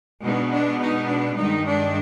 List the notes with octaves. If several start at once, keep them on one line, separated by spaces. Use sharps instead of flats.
B2 G#3 B3 D4 D#4
D4
D#4
D4
G2 D#3 G#3 D#4
D4